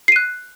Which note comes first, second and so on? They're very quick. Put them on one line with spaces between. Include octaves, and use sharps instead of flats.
C7 D#7 F#6